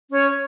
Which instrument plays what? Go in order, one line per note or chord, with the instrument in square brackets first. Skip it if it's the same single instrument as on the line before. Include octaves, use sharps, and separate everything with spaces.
[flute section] C#4 C#5